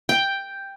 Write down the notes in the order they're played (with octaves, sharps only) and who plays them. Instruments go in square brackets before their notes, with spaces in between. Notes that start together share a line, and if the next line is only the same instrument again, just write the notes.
[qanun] G5